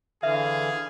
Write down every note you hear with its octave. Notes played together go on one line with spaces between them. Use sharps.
D3 E3 G#4 E5 F5